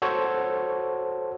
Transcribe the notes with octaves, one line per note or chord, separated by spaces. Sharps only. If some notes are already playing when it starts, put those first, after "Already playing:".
F#4 A4 C5 C#5